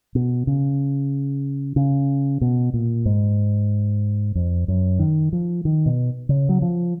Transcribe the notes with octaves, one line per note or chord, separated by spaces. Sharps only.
B2
C#3
C#3
B2
A#2
G#2
F2
F#2
D#3
F3
D#3
B2
C#3
F#3
F3